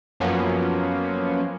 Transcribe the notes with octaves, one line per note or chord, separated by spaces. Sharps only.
F#2 F3 F#3 A#3 B3 C#4